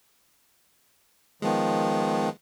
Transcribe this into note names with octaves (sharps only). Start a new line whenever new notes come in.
D#3 F3 G#3 B3